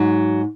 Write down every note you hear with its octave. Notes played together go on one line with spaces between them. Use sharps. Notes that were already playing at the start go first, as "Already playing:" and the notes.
Already playing: G#2 F#3